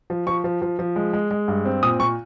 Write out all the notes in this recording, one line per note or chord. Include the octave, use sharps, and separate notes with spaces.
F3
F3 C#6
F3
F3
F3
G#3
G#3
G#3
G2
C4
A#2 D#6
A#2 C#6